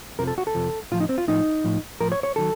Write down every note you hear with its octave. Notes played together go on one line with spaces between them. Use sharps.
F2 C3 F3 A#4
A4
F#4
A4
F2 C3 F3
A2 F3 F4
D#4
C4
F4
A2 F3 D#4
A2 F3
A2 F3 A#4
C#5
C#5
D#3 F#3 A4